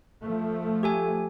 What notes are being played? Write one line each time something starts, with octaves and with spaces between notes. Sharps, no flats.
F3 A3
G4 A4 G#5